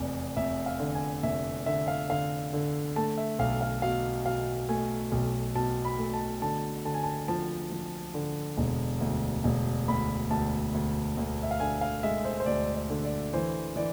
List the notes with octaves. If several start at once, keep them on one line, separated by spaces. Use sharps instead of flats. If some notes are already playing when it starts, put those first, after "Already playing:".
Already playing: F1 E2 D5
F1 E5
F5
D3
G#5
F1 E5
D3 E5
F5
D3 F5
D3
A3 A5
E5
B1 F5
F5
B2 F5
B2 F5
A3 G#5
B1
B2 A5
B5
A3
A5
D3 A5
D3 A5
G#5
A5
F3 A5
F3
D3
E1
D2
E1
D2 B5
D2 A5
D2
D2
E5
F5
D3 G#5
F5
G#3 E5
C5
C5
D2 D5
D5
D3
D5
E3 C5
E3 D5